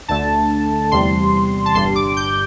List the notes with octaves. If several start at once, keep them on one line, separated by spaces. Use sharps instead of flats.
D2 D3 A3 A5
E2 C3 G3 C6
A5
G1 G2 G3 C6
D6
G6